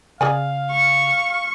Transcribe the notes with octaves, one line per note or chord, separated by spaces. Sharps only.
C#3 G#4 D5 F5 G#5
C#6